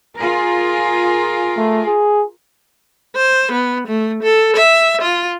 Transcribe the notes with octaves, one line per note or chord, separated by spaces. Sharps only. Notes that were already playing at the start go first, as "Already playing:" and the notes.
F4 G#4 A#4
A3
G#4
C5
B3
A3
A4
E5
F4